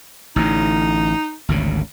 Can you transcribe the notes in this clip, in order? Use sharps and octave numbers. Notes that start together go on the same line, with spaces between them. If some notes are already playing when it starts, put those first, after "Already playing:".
A1 A2 D3 D#4
G#1 D2 C#3